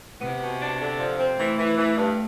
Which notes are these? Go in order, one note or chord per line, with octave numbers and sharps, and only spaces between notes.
C3 B3
B2
D4
D3
F3
C4
E3 A3
E3
E3
G2